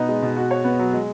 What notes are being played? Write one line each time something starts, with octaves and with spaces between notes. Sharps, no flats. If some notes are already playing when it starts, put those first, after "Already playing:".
Already playing: B2 B3 D#4
G#3
B2
F#4
C#5
B3
F#3
G#3